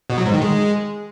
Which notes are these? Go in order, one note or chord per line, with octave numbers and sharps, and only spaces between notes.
B2
F#3
G#2
D#3
G#3